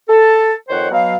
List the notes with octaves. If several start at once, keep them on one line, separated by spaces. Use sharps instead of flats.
A4
F2 D#3 C5 C#5 F#5 G5
B2 F#3 F5